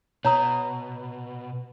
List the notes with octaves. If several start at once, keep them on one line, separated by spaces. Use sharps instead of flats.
B2 C#5 A#5 D#6